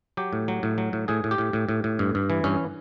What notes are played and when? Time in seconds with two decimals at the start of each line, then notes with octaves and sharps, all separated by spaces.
0.17 F#3 G4
0.33 A2
0.48 F#3
0.63 A2
0.78 F#3
0.93 A2
1.08 A2 G#4
1.24 A2
1.31 G4
1.38 A2
1.53 A2
1.69 A2
1.84 A2
1.99 G2
2.15 G2
2.30 E3
2.44 G2 C#4